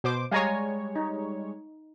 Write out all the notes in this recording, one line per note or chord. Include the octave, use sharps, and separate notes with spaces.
B2 C5 D6
G3 G#3 C#5 F5 G#5 A#5
D#4